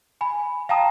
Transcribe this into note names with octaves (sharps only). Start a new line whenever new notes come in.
G#5 B5
F5 G5 A5 A#5 D#6